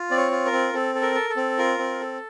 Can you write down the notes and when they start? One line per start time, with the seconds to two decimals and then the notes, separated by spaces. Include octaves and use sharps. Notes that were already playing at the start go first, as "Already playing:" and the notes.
Already playing: F4
0.11 C4 D5
0.17 C#5
0.32 F4
0.46 A#4
0.52 C4
0.73 C4 A4
0.95 A4
1.02 A#4
1.15 A4
1.30 A4
1.37 C4
1.58 F4 A#4
1.78 C4
2.01 A4